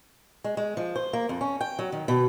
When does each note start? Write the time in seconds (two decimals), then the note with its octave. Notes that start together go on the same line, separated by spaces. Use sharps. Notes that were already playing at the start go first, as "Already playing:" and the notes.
0.44 G#3
0.57 G#3
0.77 F3
0.96 C5
1.13 A#3
1.29 F2
1.41 C#4
1.61 G5
1.79 F#3
1.92 D#3
2.08 B2